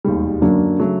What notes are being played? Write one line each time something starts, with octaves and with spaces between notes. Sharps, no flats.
E1 D#2 D#3 G3
F#2 D3 F#3 A#3 D4
C#3 F#3 A3